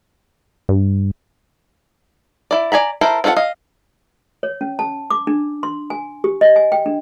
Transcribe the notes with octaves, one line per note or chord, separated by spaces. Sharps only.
G2
E4 D5
D5 G#5 A#5 B5
E4 A4 A#4 C5
C4 F4 A4 B4 F#5
D#5 F5
C#5
C#4
A5
D6
D4
C6
G#5
G4
D#5
G#5
G5
D4